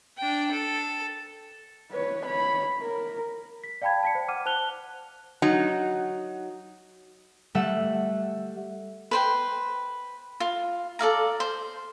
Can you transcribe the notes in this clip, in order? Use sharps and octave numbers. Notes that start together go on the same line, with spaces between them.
D4 G5
A4
B4 C#5
C#5 B5
A#4
B6
D5 F5 G5 A5 B5 G#6
A5 B6 C#7
C5
F#5 D6 F6 D#7
C5 A5 F#6 F7 G7
F#3 D#4 F#4
G3 A3 E5 F#5
B4 C5 G5
F4
A4 D5 F5 A#5
C5